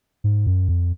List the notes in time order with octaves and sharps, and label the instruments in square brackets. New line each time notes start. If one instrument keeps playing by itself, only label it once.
[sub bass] G#2
F#2
F2